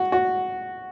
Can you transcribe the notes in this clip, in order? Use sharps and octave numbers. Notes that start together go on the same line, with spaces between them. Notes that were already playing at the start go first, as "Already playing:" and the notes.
Already playing: F#4
F#4